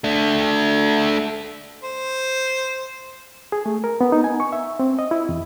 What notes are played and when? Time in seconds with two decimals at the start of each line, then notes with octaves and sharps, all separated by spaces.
0.04 A3 D4
1.84 C5
3.52 G#4
3.66 A3
3.84 A#4
4.01 B3
4.12 D#4
4.24 G#5
4.40 C#6
4.52 E5
4.79 C4
4.99 D#5
5.11 E4
5.29 E2